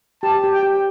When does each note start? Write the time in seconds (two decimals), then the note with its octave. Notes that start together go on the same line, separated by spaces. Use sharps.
0.23 G4 A5
0.44 G4
0.53 G5
0.63 G4